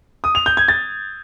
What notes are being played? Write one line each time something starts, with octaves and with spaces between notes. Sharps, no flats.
D#6
F7
G6
G#6
A6